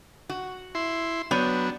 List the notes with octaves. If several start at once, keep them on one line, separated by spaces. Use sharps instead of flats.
F#4
E4 C6
F#3 B3 D4 C#5 G5